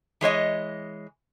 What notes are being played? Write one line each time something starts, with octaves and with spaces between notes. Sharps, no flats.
E3 G#3 C#5 D#5